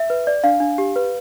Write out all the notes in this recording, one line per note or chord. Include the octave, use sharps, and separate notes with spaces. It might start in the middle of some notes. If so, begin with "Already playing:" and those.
Already playing: E5
B4
D5
D4 F5
D4
G4
B4